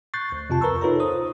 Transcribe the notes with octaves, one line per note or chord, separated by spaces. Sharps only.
C#6 F#6 G6 A6 C7
D2
F2 C3 F4 A5
A#4 B4 A#5 C#6 E6
D#4 F4 A4 B4 C#5 A#5
C5 D#6